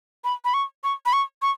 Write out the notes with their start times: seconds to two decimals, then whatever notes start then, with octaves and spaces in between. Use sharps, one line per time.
0.24 B5
0.45 B5
0.54 C#6
0.84 C#6
1.06 B5
1.13 C#6
1.42 C#6